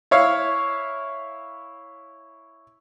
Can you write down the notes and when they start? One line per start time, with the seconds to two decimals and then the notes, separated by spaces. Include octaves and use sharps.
0.11 E4 C#5 F5